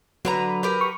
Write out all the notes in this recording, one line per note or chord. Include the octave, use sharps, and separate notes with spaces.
D3 F#3 B4 A#5
G4 A#4 B4
C#6